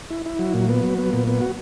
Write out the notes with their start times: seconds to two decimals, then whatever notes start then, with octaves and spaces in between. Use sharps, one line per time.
0.11 E4
0.26 E4
0.39 F#3
0.54 A#2
0.69 B3
0.83 F#3
0.98 B3
1.13 A#2
1.28 B3
1.41 F#4